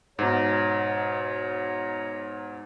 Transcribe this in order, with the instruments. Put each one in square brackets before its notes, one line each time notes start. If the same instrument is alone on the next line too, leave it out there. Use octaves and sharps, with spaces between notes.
[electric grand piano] G#2 B2 [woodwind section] G#4 C#5 A#5